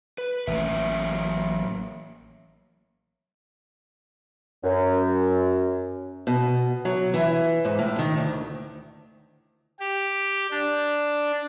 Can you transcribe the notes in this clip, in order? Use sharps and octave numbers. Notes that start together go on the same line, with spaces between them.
B4
A1 E3 F#3 A3 A#3 E5
F#2
B2
F#3
E3
G#2
A2
D#3
D2
G4
D4